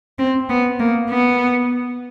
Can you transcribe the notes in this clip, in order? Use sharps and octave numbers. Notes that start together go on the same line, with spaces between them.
C4
B3
A#3
B3